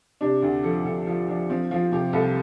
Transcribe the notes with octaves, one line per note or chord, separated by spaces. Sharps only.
C3 D4
D2
F3 A4
D2 A4
F3 F4
F3 D4
F3 C4
F3 F4
C3 G4
C2 A4